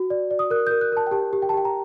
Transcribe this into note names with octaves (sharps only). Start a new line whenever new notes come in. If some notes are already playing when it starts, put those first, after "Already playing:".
Already playing: F#4
D5
D5
D#6
A#4 F#6
G6
A#4
F#6
A#4 A5
G5
G4 A5
G4
G5
A5
G4 G5
A#5